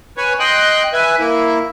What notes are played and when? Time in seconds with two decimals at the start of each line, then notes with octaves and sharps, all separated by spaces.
0.17 B4 C#5 G#5
0.40 D#5 G5 C6 F#6
0.93 B4 E5 G#5
1.19 A#3 E4